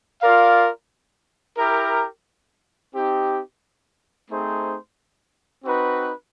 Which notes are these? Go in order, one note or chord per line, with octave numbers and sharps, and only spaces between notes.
F4 A#4 D5 F5
E4 G4 A#4
C4 D#4 G4
A3 C4 D#4 G#4 C5
C4 D#4 F#4 B4